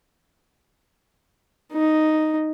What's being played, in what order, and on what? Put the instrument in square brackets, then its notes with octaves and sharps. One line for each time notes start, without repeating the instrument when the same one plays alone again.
[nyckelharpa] D#4